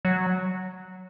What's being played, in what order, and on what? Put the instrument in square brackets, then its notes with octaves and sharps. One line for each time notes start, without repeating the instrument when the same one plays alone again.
[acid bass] F#3